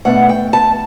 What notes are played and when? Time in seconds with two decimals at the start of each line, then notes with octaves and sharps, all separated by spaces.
0.05 B2 A3 D4 F#5
0.29 G5
0.53 A5